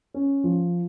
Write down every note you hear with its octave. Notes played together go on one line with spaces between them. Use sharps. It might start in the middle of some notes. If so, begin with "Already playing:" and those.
C#4
F3